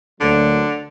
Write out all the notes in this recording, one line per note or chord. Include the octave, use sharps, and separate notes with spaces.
D2 D3 F#3 A#3